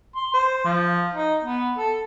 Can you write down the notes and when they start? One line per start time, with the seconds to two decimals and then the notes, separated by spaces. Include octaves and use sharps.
0.16 C6
0.33 C5
0.65 F3
1.13 D#4
1.44 B3
1.78 A4